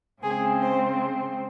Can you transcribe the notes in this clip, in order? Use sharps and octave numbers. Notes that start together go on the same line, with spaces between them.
C#3 G#3 C4 G#4
C5